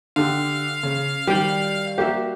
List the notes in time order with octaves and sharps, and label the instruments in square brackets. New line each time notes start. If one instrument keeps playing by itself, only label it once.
[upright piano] D3 G4 [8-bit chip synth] F5
[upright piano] C#3
[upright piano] D#3 F#7 [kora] G3 G5
[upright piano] A#3 F#4 [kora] G4 E5